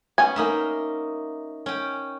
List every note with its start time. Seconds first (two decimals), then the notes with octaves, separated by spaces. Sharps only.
0.18 B3 C#4 G#5
0.36 A#3 D#4 E5
1.66 C#4 G5